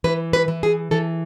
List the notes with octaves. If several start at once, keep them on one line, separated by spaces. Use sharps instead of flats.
E3 B4
B4
E3
G#4
E3 A4